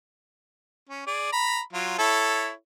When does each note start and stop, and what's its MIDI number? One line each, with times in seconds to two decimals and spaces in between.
0.89 1.06 61
1.07 1.32 68
1.07 1.32 74
1.33 1.60 82
1.33 1.60 83
1.73 1.98 54
1.73 1.98 65
1.99 2.51 64
1.99 2.51 69
1.99 2.51 73